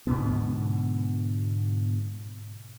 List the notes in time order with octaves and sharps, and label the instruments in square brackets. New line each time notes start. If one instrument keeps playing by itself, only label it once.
[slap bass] G#2 B2 D3 B3